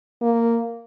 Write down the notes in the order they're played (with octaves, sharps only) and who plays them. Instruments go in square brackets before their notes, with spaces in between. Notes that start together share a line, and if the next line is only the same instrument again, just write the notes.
[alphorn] A#3